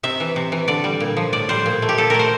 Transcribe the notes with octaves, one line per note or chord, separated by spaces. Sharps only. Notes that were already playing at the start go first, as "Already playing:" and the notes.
C3 E5
E3
C3
E3
D3 D5
G3
A#2
F3
A2 D5
G3 C5
A#2
A3
G4
A#2 A4
A3 A#4
C5